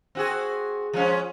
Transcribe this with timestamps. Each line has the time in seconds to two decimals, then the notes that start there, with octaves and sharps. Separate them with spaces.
0.15 C4 F#4 G#4
0.93 F3 G#3 C#4